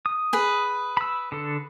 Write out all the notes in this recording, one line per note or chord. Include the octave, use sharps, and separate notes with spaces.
D#6
G#4 B4
B5 E6
D3 A4